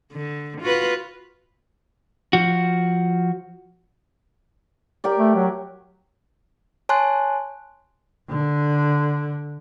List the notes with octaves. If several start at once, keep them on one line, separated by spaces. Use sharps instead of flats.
D3
F4 F#4 B4
F3 F#4
G4 A#4 D5
A3
F#3
C#5 G#5 A5 C6 F#6
D3